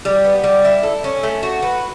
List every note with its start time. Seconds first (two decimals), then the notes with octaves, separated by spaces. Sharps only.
0.05 G3
0.24 B3
0.44 G3
0.65 E4
0.83 A4
1.04 C#4
1.23 A3
1.43 F#4
1.62 B4